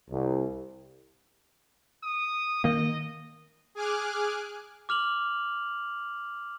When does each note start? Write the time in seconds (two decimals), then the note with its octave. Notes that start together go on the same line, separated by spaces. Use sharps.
0.11 C2
2.03 D#6
2.64 D#3 A#3 D#5
3.75 G#4 G#5 D6 F6 F#6
4.89 D6 F6 F7 F#7